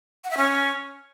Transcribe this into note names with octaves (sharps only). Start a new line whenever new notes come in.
F#5
E5
C#4